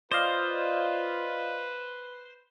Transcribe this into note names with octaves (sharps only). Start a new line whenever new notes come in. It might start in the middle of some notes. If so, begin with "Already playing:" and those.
F4 B4 C5 D5 D#5 F5